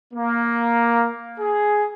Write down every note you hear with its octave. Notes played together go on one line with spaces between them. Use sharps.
A#3
G#4